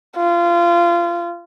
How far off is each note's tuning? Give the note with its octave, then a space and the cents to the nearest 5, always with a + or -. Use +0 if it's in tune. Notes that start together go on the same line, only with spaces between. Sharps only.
F4 -25